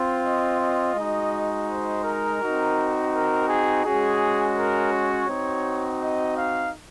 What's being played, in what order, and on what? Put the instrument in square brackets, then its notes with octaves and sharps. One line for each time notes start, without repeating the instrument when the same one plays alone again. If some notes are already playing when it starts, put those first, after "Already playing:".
Already playing: [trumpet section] C4 F4
D#5
D#5
G#3 D#4 F#4
C5
A#4
C4 D#4 F#4
A#4
G#4
G#3 C#4 F#4 G#4
A#4
C#5
C4 D#4 F#4
D#5
F5